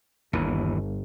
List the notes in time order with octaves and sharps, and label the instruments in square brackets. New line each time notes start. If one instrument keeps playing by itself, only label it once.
[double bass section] G1 [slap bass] D#2 E3